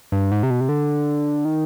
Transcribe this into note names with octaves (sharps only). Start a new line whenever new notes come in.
G2
G#2
C3
B2
C3
D3
D#3